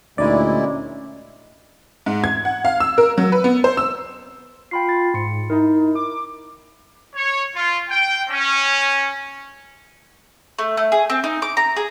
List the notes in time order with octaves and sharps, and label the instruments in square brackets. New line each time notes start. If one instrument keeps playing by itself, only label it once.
[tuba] D2 [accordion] A#2 G#3 E4 [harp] C#4 D#4 [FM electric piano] D5
[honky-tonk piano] G#2
G#6
F#5
F5
E6
A#4
F#3
B4
B3
C5
E6
[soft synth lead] F4 [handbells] G5 B5 C7
[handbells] B5 A6
[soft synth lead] G#2 [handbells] C6 C#7
[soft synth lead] D#4 [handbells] E4 A#4
[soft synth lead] D#4
D6
[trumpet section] C#5
F4
G5
C#4
[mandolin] A3
A3
G#4
C4
D#4
D6
A#5
G#4